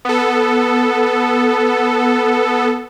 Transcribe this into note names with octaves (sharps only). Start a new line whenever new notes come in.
B3 A4